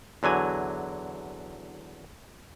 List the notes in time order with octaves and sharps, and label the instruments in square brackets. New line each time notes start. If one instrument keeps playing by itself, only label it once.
[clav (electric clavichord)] E2 D3 F#3 G#5